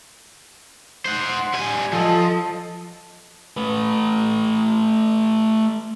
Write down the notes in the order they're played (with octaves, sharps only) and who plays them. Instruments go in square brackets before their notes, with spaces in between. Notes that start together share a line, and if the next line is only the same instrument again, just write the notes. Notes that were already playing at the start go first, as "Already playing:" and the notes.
[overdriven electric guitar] C5 F#5
G3 G#5
[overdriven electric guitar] F3 [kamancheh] A4 D#5
[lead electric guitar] A3 B4